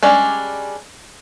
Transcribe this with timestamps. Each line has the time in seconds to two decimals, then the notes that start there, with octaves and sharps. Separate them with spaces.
0.03 G3 G#3 C#4 D4